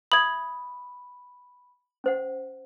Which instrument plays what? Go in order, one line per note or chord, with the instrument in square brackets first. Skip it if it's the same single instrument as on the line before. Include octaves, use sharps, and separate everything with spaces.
[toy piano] E5 D#6 [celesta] B5 [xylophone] G#6 F#7
[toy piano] C#4 C5 F#5